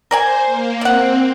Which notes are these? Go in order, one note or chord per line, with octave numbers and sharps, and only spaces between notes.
A#4 C5 D5 G#5
A#3
C4 D5 F#5